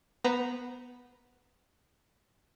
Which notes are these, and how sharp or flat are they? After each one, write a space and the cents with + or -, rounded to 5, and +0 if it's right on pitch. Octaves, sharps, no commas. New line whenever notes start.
B3 +0 C5 -30 A#5 +0